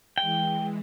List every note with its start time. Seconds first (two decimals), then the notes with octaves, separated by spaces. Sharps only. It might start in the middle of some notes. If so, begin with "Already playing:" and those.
0.18 E3 G#3 G5